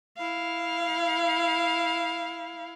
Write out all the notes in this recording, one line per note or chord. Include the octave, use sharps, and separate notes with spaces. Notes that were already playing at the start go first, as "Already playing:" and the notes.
E4 F5